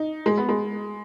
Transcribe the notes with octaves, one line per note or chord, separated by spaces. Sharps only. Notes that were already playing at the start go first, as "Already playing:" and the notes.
Already playing: D#4
G#3
B3
G#3